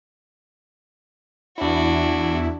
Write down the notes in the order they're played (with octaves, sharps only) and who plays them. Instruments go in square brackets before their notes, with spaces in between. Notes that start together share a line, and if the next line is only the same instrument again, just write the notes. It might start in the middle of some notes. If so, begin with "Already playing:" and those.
[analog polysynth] E2 E4 [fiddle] D4 F#4